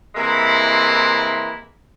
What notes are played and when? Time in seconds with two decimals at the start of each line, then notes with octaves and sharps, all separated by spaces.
0.15 C3 E3 G#3 A#3 E4